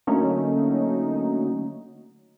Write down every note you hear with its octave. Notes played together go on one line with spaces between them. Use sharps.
D3 F#3 A3 A#3 C#4 D#4